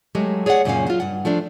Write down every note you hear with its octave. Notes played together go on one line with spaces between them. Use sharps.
F#3 G#3 A3 G4
G#4 C#5 D5 E5 F#5
F#2 A#2 C#3 F#3 C#4 F5
F#3 F4
G2 F#5
F3 A3 D4